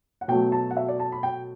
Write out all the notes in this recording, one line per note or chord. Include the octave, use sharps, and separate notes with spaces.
F#5
B2 F#3 A3 G5
A5
F#5
E5
D5
A5
B5
G5